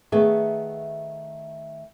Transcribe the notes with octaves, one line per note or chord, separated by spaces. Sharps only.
D#3 A3 B3 G#4 E5